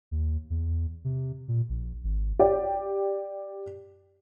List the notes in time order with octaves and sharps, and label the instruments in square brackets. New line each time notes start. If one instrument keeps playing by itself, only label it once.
[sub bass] D#2
E2
C3
A#2
A#1
G#1
[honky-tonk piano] G4 D5